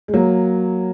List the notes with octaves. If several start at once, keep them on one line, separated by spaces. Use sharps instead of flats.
G#3
F#3 A#3